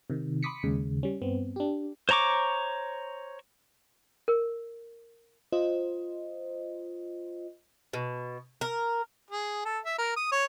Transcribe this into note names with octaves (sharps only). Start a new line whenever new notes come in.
C3 D#3
B5 C6 D6 D#6 B6 C#7
D#2 C#3 G#3
G3 C#4
G2 B3 C4
D4 G4
C5 C#5 A#5 C#6 D6
A#4
F4 C5 D#5
B2
A#4
G#4
A4
E5
A#4
D#6
C#5